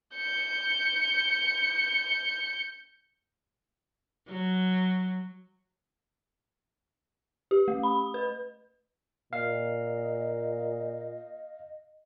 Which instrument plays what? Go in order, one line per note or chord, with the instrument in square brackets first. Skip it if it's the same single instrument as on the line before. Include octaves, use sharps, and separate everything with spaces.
[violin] G6 C#7
[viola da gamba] F#3
[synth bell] G4
A3
B5
B4
[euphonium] A#2 [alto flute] D#5 [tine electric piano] F5